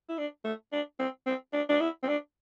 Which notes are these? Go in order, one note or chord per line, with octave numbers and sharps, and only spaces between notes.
E4
D4
A3
D4
C4
C4
D4
D4
E4
C4
D4